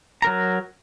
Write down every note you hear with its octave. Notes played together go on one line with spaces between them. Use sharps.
F#3 A#4 A#5